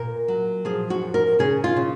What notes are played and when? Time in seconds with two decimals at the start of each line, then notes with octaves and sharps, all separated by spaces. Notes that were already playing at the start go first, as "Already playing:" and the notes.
Already playing: A#2 A#4
0.28 F#3
0.65 F3 G#4
0.90 F#4
1.02 F#2
1.14 A#4
1.39 C#3 G#4
1.64 F4
1.76 C#3